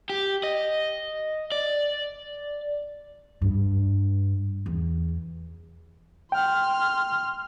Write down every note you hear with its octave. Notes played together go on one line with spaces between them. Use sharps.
G4
D#5
D5
G2
E2
G5 C6 F6